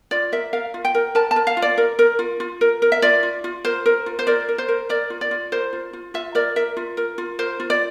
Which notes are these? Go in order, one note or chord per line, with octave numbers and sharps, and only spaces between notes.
F4 D5
A#4 E5
A#4 F5
F4
G5
A#4
A#4 A5
A5
A#4
F5
F4
D5
A#4
A#4
F4
F4
A#4
A#4
E5
F4 D5
F4
F4
A#4 C5
A#4
F4
C5
A#4 D5
A#4
C5
A#4
A#4 D5
F4
D5
F4
A#4 C5
F4
F4
F4 E5
A#4 D5
A#4 E5
F4
A#4
F4
A#4 C5
F4
D5